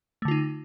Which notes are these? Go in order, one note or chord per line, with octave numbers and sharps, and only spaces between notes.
D3 A3 D#4 F4